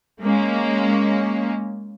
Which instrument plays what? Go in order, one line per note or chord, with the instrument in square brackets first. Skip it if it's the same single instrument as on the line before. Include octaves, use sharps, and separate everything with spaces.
[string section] G#3 A#3 C#4